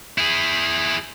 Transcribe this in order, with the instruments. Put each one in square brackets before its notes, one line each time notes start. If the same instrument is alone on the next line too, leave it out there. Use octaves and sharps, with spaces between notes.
[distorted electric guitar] E4 G#4